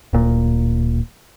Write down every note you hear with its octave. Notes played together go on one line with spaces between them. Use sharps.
D1 A#2